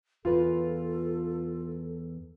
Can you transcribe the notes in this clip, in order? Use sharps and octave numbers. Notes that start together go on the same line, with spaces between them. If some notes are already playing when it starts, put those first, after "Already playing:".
E2 F4 A4 B4